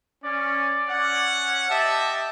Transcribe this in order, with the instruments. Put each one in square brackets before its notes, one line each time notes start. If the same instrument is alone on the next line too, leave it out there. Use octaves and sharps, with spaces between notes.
[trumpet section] C#4 [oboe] D5
[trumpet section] C#4 C#5 F#5
[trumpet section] G4 D#5 E5 [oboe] A5